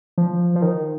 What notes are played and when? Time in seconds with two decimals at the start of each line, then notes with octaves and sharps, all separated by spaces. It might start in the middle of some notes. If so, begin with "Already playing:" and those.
0.18 F3
0.56 F3
0.62 D#3